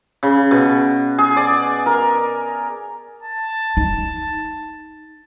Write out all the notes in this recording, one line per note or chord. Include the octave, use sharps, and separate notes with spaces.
C#3
B2
G#4
D5
A#4
A5
D#4